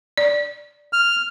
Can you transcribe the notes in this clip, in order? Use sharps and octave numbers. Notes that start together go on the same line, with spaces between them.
D5
F6